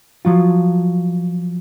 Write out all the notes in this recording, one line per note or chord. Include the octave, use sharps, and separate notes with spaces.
F3 F#3 F4